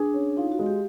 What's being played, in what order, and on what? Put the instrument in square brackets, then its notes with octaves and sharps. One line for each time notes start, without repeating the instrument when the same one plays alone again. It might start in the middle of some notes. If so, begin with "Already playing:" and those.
Already playing: [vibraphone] D4 [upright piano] G#4
[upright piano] C#4
[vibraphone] D#4 [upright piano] F4
[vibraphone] F#4
[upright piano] G#3
[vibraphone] G4